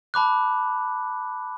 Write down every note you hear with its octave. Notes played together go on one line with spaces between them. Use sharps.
A5 B5 D6 F#6